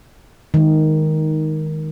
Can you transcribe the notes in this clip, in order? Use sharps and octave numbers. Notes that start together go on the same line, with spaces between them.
D#3 G#3